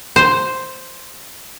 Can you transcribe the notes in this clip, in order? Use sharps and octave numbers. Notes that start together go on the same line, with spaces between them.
C5